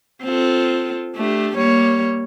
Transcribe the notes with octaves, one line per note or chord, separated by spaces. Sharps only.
C4 F4 A4
A3 D4 G4
G3 A#3 C#5